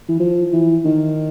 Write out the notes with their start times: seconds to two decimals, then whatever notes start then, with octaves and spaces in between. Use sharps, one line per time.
0.08 E3
0.20 F3
0.53 E3
0.85 D#3